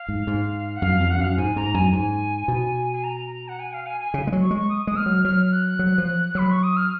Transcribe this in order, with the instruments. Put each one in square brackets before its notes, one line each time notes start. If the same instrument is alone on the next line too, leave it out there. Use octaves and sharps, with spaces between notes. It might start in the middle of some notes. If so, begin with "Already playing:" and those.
Already playing: [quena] F5
[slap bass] G#2
G#2
[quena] F#5
[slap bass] F#2 [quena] F5
[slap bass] F2
[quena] F#5
[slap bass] F#2 [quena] F5
[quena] F#5
[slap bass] G#2 [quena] G#5
[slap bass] G#2 [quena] A#5
[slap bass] F#2 [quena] G#5
[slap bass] G#2 [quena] G#5
[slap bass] B2
[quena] G#5
A#5
F#5
G#5
F5
G#5
G#5
[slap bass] C#3
G#3
F#3
[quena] C#6
[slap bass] G#3
[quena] C#6
D#6
[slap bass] G#3 [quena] D#6
[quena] F6
[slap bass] F#3
[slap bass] F#3 [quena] F6
[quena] F#6
[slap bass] F#3
F3
[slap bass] F#3 [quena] B5
[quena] C#6
D#6
F6